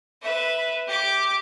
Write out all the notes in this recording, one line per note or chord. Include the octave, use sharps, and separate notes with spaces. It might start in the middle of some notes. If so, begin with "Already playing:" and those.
B4 E5
G4 D6